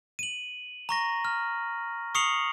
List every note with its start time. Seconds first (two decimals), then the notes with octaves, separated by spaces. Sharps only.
0.19 D#7 F#7
0.89 A#5 C#6 A#6
1.25 F6
2.15 C#6 D#6 C7 C#7 F7 F#7